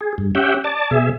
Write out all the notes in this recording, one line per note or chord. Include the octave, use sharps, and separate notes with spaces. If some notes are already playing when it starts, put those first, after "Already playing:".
G#4
G2
C#4 G4 E5 F#5 G5
D5 A5
B2 G#4 E5